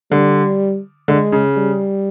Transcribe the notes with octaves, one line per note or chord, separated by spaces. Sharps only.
D3 G3
D3 G#3
C#3
G3